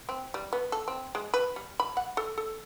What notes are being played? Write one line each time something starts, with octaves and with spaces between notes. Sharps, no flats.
C4
G3
B3
A4
C4
G#3
B4
G3
B5
F#5
A4
A4